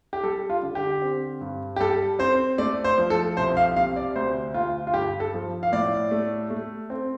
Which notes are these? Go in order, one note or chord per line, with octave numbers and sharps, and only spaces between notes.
G4
G3 A4
F4
D3
G4
C4
G2
G4
G3 A4
C4 C5
A3 D5
C5
F3
A4
C2 C5
F5
C3 F5
D5
D2 C5
D2 F4
F4
G2 G4
A4
F3
F5
A2 D5
A3
A3
C4